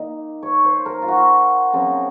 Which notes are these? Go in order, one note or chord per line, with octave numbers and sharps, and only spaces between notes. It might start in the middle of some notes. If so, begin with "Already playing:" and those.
Already playing: D#3 A#3 D#4
C#5
C5
A#4
F4
F#4
C#3 F#3 C4